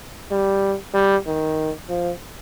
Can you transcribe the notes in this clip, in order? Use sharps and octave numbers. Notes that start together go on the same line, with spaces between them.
G3
G3
D#3
F3